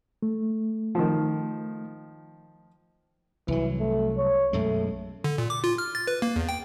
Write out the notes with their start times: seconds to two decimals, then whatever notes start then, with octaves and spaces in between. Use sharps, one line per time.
0.22 A3
0.95 D#3 F3
3.48 C2 E3 F#3
3.80 A3
4.18 C#5
4.53 B1 F#2 G#3 A3
5.24 D3
5.38 A#2
5.50 D6
5.64 F4
5.78 F6
5.95 A6
6.07 B4
6.22 A#3
6.36 E2
6.49 G5